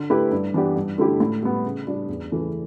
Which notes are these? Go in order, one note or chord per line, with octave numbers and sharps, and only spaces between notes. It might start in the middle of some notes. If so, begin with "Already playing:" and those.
Already playing: D3
A3 E4 G4 B4
G2
E3 B3 D4 G4
G2
D3 A3 E4 G4
A2
G3 B3
C#3
G3 D4
E2
C#3 E3 A3